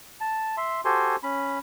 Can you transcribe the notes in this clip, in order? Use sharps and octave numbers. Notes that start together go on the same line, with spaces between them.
A5
E5 C6
F#4 G4 A4 C5 G#5 C6
C#4 B5